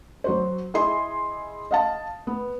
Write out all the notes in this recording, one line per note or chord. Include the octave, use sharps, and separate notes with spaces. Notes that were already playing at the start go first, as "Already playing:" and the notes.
F#3 F#4 C5
E4 G#4 D#5 C6
D#5 F5 A5
B3